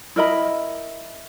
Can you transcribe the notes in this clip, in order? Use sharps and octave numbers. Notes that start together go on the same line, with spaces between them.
E4 A#4 D#5 B5